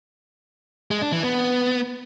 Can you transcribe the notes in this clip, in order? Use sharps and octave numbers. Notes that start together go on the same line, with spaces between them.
G#3
D4
E3
B3